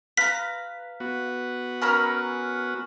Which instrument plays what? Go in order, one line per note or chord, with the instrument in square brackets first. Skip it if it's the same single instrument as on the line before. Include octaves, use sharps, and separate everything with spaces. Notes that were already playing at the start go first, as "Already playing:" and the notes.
[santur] B4 [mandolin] F5 A#5 [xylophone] B6
[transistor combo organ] B3 F#4
[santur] C#4 A#4 [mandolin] A#5 B5 E6